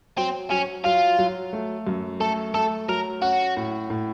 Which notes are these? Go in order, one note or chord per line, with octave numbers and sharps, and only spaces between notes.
F#3 C4
F#3 C#4
F#3 F4
F#3
A3
F#2
A3 A4
A3 A4
F#3 A#4
C#4 F#4
A2
A2